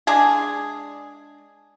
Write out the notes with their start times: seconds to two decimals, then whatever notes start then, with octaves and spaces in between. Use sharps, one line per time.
0.07 G#3 D4 G#4